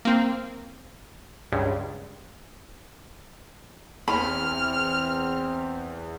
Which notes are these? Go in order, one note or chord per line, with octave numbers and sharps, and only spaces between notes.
A#3 C4
C#2 G2
E2 C4 B5 F6